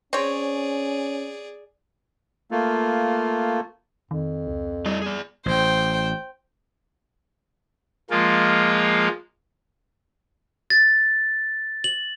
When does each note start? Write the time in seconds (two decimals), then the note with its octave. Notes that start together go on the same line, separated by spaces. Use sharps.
0.13 C4 C#4 G#4 C#5 D5
2.51 A3 A#3 F4
4.11 F2 D#3
4.47 C#2
4.86 G3 E4 D5 D#5
5.02 G#4 D5
5.46 A1 C5 G5
8.10 F3 G#3 A#3 F4
10.70 A6
11.84 F#7